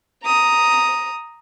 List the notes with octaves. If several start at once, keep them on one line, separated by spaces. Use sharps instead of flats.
A#5 D#6